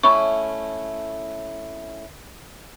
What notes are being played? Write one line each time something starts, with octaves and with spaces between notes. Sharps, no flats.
A3 C#4 E4 B5 C#6